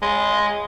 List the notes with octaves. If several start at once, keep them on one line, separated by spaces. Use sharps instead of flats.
G#3